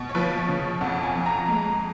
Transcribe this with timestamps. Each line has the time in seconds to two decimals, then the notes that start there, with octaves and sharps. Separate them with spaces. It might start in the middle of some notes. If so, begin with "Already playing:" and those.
Already playing: B2
0.09 C#5
0.15 F3 B4
0.38 C#5
0.48 C#3
0.81 F2 F#5
1.03 G#5
1.15 F2
1.26 A#5
1.47 G#3 A#5